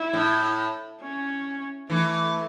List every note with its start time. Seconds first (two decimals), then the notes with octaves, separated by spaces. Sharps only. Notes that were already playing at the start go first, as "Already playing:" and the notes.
Already playing: E4
0.13 A2
1.02 C#4
1.90 E3 A3